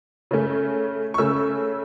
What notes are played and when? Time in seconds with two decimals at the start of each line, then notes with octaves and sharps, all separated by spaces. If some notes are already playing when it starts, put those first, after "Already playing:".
0.31 C#3 A3 C#4
1.14 C#6
1.18 C#3 A3 C#4 E6